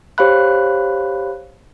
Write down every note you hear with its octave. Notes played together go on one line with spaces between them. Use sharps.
G4 C5 C#5 F5 B5 F#6